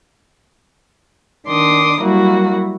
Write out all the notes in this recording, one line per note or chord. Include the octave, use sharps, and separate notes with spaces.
D#3 D4 C6 D6 D#6
F#3 G3 A#3 E4 F#4